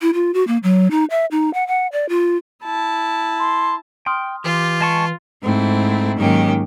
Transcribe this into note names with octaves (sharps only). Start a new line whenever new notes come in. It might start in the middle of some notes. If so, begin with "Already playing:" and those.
E4
F4
F#4
A#3
F#3
D#4
E5
D#4
F#5
F#5
D5
F4
E4 A5
C6
G5 C6 D#6 F6
E3 F4 G4
G#3 A5 C#6
G#2 A3 C4 E4
G#2 D#3 F#3 A#3 C#4 G4